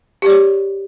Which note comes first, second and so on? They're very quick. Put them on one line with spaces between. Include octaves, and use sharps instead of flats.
G4 D5 C#5